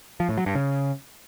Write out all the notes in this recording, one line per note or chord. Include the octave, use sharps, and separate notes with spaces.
F3
A2
F#3
G2
C#3